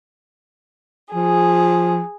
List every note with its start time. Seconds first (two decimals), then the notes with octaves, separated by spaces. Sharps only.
1.15 F3 G#4